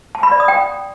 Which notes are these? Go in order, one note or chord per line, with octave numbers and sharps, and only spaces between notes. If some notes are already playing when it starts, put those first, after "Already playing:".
A5
B5
D5
D#6
G5